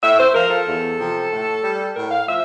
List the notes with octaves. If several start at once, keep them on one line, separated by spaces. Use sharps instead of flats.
A2 E5
C5
F3 A#4
A4
E2
C3 F3
A2
G3
A2 A#4
F5
F3 E5